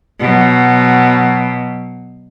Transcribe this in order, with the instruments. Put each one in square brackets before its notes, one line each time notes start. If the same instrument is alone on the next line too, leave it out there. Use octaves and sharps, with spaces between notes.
[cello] B2 F#3